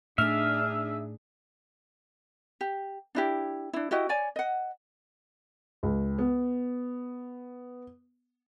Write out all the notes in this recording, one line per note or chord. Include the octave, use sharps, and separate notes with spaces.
A2 A3 D4 D#4 G#4 E5 F6
G4
D4 E4 G4
D4 E4
E4 F#4 G4 D#5
C#5 D5 G#5
D#5 F#5
C#2
B3